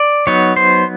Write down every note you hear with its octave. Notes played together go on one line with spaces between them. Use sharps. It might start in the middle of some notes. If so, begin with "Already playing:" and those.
Already playing: D5
F#3 B3 D#4 C#5
C5